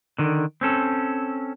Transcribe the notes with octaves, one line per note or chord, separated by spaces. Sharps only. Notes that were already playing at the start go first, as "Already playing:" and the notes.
D3 D#3
C4 C#4 A4